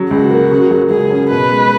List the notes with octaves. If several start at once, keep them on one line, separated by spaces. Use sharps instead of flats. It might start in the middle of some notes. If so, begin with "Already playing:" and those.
Already playing: C#3 F#3
C#2 F#4
A#3
C#3
F#3
C#2 G#4
C#4
B2 B4
G#3